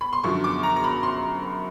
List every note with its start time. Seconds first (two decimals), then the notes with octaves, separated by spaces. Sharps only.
0.01 B5
0.13 C6
0.23 F#2 D3 F3 C#6
0.44 D6
0.63 A#5
0.76 A#5
0.84 B5
1.03 C6